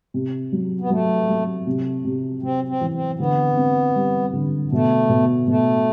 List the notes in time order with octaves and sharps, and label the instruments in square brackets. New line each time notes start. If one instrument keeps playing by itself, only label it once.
[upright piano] C3
F#3
[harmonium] B3
[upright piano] F#3 [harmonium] A3
[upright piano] F#3
C3
C3
[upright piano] C3 [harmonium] C4
[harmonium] C4
[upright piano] E3
[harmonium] C4
[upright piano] D3 [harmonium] B3
[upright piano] C4
G3
D3
[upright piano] B2 [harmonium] A3
[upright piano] B2
[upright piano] B2 [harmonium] A3